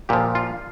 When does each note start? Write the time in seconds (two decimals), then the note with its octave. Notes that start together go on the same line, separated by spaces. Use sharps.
0.09 A#2 F3 G4
0.35 F4